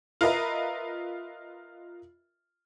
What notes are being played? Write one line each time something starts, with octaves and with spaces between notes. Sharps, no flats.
F4 A#4 B4 D#5 E5 A#5